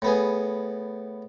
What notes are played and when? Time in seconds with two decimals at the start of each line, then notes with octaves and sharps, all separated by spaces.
0.02 A2 B3 G#4